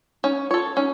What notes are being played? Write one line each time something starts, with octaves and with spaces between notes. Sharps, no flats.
C#4 D#4
F4 A4 C#5
C#4 D#4